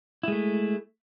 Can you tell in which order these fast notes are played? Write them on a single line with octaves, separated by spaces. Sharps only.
E4 G#3 A3